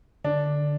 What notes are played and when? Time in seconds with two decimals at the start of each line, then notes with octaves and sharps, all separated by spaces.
0.24 D3 D4